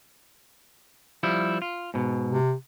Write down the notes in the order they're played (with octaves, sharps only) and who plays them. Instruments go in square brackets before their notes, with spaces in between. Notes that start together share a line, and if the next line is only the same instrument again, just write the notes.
[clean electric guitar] F3 G3 E4
F4
G#2 B2
[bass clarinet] C3